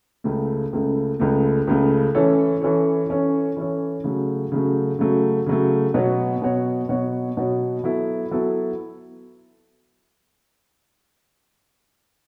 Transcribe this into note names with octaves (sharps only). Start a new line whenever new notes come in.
C#2 C#3 A3
C#2 C#3 A3
C#2 C#3 A3
C#2 C#3 A3
E3 C#4 A4 C#5
E3 C#4 A4 C#5
E3 C#4 A4 C#5
E3 C#4 A4 C#5
C#3 F#3 A3
C#3 F#3 A3
C#3 F#3 A3
C#3 F#3 A3
B2 F#3 B3 F#4 C#5
B2 F#3 B3 F#4 C#5
B2 F#3 B3 F#4 C#5
B2 F#3 B3 F#4 C#5
F#3 B3 E4 A4
F#3 B3 E4 A4